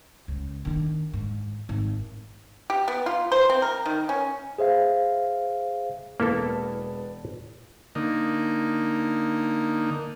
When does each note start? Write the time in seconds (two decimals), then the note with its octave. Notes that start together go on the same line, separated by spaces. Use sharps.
0.28 C#2
0.65 D#3 D4
1.13 G#2
1.69 G#1
2.70 G4
2.88 B3
3.06 F4
3.32 C5
3.50 C4
3.62 A#4
3.86 D#3
4.09 C#4
4.58 G#4 C5 E5 F5
6.20 E1 A#3 B3 E4 A4 A5
7.95 D3 A#3 D#4